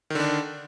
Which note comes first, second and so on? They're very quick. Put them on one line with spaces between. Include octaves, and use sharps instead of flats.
D#3 D3 D4